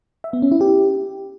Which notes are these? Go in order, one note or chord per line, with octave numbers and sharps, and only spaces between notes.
E5
B3
C#4
E4
G4